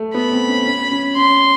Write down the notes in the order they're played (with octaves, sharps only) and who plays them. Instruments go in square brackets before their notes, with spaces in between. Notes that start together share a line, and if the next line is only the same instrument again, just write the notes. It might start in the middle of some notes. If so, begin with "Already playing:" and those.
Already playing: [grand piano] A3
[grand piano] B3 [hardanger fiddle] B5
[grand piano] C4
C#4
C#4
C#4
[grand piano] C#4 [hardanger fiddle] C6